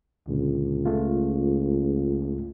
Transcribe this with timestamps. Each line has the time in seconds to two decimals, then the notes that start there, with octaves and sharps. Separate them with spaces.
0.28 C#2 A#2 D3
0.86 A3 F4